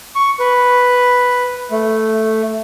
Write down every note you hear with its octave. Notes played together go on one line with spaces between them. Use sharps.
C#6
B4
A3